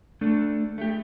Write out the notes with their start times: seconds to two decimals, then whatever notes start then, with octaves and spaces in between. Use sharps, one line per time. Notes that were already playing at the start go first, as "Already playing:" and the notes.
0.21 A3 D4 A4
0.78 A3 G4